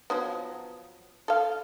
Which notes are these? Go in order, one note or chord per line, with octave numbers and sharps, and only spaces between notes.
F3 F#3 B3
A4 F5